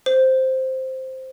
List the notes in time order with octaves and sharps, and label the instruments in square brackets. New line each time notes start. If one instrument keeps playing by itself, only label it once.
[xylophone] C5